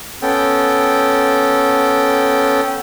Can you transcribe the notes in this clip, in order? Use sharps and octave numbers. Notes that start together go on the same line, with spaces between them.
B3 C#4 A4 G5